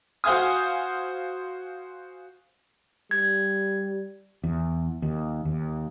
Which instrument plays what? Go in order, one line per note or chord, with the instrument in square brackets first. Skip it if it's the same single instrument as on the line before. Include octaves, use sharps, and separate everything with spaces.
[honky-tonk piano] F#4 C5 F5 G#5 D#6
[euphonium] G3 [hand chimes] G#6
[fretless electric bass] E2
D#2
D#2